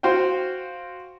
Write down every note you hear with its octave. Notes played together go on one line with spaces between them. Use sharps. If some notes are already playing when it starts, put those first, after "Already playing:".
F#4 C5 F5 G5